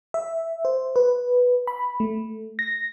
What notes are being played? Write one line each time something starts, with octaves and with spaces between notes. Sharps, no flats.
E5
C5
B4
B5
A3
A#6